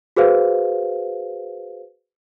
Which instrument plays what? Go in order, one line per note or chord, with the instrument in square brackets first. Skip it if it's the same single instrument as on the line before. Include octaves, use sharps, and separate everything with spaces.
[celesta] F#4 G#4 B4 C5 F5